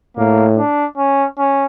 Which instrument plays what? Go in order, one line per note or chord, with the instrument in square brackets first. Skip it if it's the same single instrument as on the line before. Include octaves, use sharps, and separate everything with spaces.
[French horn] A2 [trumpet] A#3
[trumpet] D4
C#4
C#4